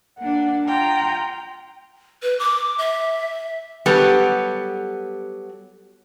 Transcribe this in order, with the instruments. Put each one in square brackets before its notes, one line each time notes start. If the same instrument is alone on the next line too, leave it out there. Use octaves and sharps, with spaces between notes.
[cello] A#3 D4 [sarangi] F#5
[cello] F4 [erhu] G5 [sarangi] A#5
[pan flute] B4
D6
E5
[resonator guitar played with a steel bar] F#3 G3 B3 G4 A4